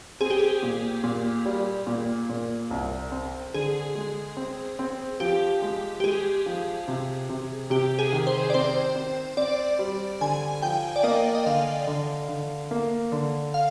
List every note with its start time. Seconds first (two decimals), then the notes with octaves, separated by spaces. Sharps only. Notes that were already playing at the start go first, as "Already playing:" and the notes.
0.21 C4 G#4
0.30 G4
0.40 G#4
0.63 A#2
1.04 A#2
1.46 G3
1.87 A#2
2.30 A#2
2.71 C2
3.12 C4
3.54 D3 G#4
3.95 G#3
4.37 C4
4.79 C4
5.20 F3 G4
5.62 G#3
6.00 G4
6.04 G#3 G#4
6.46 F3
6.88 C3
7.29 C3
7.70 C3 G4
7.99 G#4
8.12 D#3
8.27 C5
8.50 D5
8.54 C4 C5
8.96 C4
9.37 C4 D5
9.79 G3
10.21 D3 G#5
10.62 F3 G5
10.96 D5
11.03 A#3 D#5
11.35 D#5
11.46 D3 F5
11.87 D3
12.28 D3
12.71 A#3
13.12 D3
13.54 F5